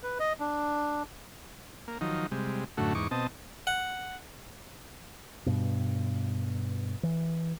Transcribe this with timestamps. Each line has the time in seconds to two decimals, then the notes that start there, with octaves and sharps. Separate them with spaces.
0.03 B4
0.20 D#5
0.40 D4
1.88 A#3
2.01 D#3 F3 F#3 D#4
2.32 C3 G3 G#3
2.77 F#2 A2 D3 A3 F#4
2.95 E2 G#2 D#4 C#6 D6
3.11 B2 C4 D#5 A5
3.67 F#5
5.46 G2 B2
7.03 E3